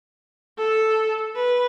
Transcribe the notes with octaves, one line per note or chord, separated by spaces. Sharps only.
A4
B4